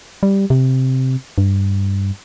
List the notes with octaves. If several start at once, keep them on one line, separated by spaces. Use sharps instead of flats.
G3
C3
G2